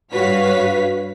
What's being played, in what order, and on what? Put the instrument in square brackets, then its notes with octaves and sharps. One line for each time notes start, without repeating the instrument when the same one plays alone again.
[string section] G2 F#4 B4 C#5 F5 B6